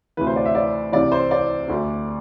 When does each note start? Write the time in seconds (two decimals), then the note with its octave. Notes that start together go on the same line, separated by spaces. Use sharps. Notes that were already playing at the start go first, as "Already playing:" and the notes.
0.17 D2 C3 E3 B4
0.27 C5
0.36 D5
0.45 E5
0.55 D5
0.92 C2 C3 E3 D5
1.12 C5
1.31 D5
1.68 D2 D3